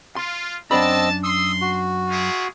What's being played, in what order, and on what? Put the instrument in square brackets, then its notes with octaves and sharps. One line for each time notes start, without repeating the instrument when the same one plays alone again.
[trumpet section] F4 [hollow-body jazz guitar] C6
[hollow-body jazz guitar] F#2 D4 B5 [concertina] C4 D#5 E6 [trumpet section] A5
[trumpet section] C6 [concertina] D#6 E6
[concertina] F#4
[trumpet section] E4 F4 G#4